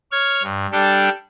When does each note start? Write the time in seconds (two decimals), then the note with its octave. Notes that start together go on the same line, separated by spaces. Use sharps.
0.11 C#5 F6 G#6
0.43 G2
0.72 G3 D4 G4 A4